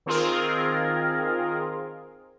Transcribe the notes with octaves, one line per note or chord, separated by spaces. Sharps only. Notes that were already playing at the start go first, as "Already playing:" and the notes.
D#3 C4 F4 G#4 A#4